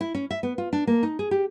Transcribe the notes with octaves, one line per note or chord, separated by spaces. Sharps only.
E4
C#4
E5
B3
F4
D4
A#3
D#4
G#4
G4